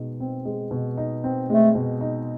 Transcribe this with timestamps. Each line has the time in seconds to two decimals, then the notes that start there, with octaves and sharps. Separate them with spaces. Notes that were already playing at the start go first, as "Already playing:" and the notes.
Already playing: B2 G#3 D#4
0.20 C4
0.45 G#3
0.71 B2
0.97 D#4
1.24 C4
1.49 G#3 A3
1.75 B2
2.01 D#4